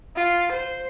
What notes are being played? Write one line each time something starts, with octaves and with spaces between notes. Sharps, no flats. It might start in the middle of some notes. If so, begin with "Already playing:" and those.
F4
C5